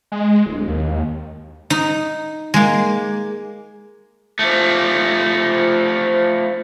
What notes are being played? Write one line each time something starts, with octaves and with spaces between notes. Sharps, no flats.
G#3
D1
D#2
D#4
G#3 A#3
F3 A3